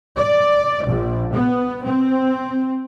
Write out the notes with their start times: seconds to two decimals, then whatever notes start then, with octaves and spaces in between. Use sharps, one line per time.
0.17 D5
0.86 A#1
1.34 B3
1.84 C4